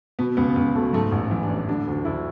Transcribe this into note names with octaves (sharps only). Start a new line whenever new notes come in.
B2 B3
C#2 B3
C#2 B3
B2 A3
G#2 A3
A1
E3
D4
A1
D3 D4
D2
D2 E4